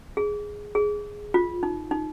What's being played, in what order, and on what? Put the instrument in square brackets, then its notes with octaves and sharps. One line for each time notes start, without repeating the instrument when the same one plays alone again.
[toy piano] G#4
G#4
F4
D#4
D#4